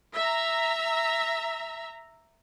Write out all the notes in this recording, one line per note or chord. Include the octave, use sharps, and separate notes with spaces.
E5 A#5